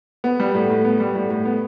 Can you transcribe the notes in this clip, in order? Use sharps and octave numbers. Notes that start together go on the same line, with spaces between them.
B3
G3
A2
A2
B3
G3
A2
A2
B3